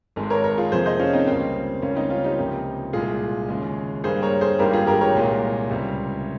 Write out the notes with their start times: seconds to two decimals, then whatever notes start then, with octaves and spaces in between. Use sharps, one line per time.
0.16 G#1 G#2 D#3 G#3
0.30 A#4 C#5
0.44 A#4 C#5
0.58 F4 G#4
0.72 F2 C3 F3 A#3 G#4 C5
0.86 C5 D#5
0.99 C#4 F4
1.13 C4 D#4
1.27 C#2 C#3 G3 A#3 C4
1.82 C#2 C#3 G3 A#3 C#4
1.96 C4 D#4
2.10 C#4 F4
2.24 D#4 G4
2.38 C#2 C3 F3 A#3
2.93 C2 A#2 G#3 F4 G#4
3.49 D#2 C#3 G#3
4.04 G2 G3 A#3 G#4 C5
4.22 A#4 C#5
4.41 G#4 C5
4.59 G#1 G2 D#3 G3 A#3 G4 A#4
4.73 F4 G#4
4.87 G4 A#4
5.01 A#4 C#5
5.15 C2 A#2 G#3
5.70 C#2 C3 G3